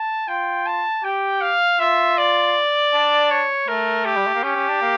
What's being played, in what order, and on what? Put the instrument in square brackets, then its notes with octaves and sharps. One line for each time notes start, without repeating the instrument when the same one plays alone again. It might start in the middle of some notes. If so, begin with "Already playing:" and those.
Already playing: [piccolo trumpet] A5
[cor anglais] F4 [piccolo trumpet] G5
[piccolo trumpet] A5
[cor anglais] G4 [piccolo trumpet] G5
[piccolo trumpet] F5
[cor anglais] F4 [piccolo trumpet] E5
[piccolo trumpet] D5
[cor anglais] D4
[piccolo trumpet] C#5
[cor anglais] A3 [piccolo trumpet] A#4
[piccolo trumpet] G4
[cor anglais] G3
A3
A#3
[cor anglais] C#4 [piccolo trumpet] G4
[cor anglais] C#4
D4
A#3